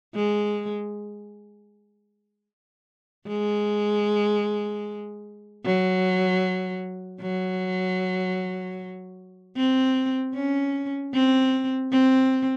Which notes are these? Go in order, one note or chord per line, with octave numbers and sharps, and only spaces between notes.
G#3
G#3
F#3
F#3
C4
C#4
C4
C4